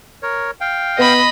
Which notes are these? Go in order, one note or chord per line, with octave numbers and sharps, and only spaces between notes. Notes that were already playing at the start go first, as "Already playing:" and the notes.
A#4 C#5
F5 G5
B3 D#5 B5